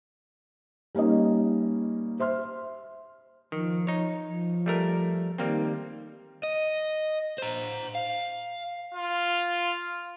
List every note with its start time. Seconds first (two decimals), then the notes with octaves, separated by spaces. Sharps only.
0.95 G3 A#3 C#4 D#4 D#5
2.20 C5 E5 C6 F6
3.52 D#3 F3
3.87 D#4 C#5
4.27 F3
4.66 G3 A3 A#4
5.38 D#3 G3 A#3 C4
6.43 D#5
7.38 C5 A#5
7.95 F5
8.95 F4